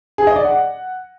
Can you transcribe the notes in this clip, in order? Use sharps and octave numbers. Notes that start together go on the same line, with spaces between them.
G#4
D#5
D5
F#5